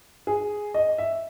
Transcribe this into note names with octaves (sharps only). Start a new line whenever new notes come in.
G#4
D#5
E5